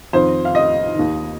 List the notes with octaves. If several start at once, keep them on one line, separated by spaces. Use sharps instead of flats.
F2 D#3 C5
F5
D#5
D#2 D#3